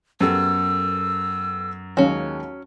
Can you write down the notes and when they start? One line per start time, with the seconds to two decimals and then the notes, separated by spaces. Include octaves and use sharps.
0.21 F#2 B3 G4 A4 E6
1.97 D#2 F#3 G#3 C#4 F5